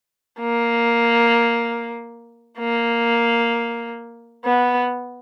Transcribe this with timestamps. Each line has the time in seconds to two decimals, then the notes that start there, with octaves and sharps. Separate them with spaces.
0.40 A#3
2.58 A#3
4.45 B3